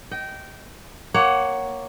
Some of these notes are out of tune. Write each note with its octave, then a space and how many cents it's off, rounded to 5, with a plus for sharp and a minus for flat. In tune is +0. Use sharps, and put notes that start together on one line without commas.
D#5 +0 G5 -20
A#3 +0 C#5 +0 F#5 +20